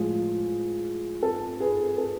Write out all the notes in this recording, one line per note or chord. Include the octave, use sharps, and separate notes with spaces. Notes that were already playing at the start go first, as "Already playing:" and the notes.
Already playing: A2 F3 G#3 G#4
A4
G#4 B4
A4